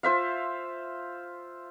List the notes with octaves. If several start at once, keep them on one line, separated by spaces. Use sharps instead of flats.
F4 C5 E5 F5